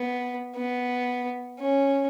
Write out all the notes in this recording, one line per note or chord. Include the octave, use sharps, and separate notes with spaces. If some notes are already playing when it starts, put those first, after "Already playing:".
Already playing: B3
B3
C#4